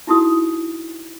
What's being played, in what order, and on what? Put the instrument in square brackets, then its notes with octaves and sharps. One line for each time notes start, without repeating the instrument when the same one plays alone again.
[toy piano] D#4 E4 F#4 A4 D#6